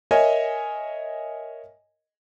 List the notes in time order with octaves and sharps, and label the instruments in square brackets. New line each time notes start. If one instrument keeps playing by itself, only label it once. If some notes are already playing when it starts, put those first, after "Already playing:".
[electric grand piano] A#4 C#5 D#5 E5 G#5